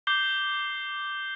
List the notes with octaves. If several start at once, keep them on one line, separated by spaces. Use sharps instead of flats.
D6 G6 C7 G7